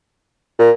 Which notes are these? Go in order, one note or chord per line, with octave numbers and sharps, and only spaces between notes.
A#2